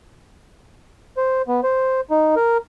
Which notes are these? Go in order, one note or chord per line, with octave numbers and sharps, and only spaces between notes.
C5
B3
C5
D#4
A#4